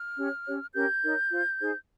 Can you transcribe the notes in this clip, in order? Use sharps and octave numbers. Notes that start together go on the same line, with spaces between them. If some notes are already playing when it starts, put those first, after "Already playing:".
Already playing: F6
C#4 G4 C#5
C#4 G4 C#5
C#4 G4 A#4 G6
D#4 A#4 C#5
F4 C5
D#4 G#4 C5